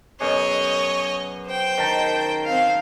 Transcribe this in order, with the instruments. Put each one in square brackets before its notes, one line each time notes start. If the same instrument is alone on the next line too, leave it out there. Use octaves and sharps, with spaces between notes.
[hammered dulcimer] F#2 B2 G#4 [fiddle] C#5 D#5
[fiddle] C5 G5
[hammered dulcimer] D#3 A5 A#5
[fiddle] C4 F5